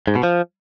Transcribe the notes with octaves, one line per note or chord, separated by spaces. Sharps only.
G#2
B2
F3